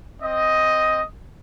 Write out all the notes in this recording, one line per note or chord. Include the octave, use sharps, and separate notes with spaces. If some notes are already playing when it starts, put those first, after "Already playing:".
C4 D#5